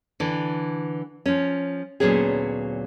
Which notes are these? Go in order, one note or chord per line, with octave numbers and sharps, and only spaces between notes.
D3 E3
F3 C#4
D2 A#2 F#3 B3 C#4 G#4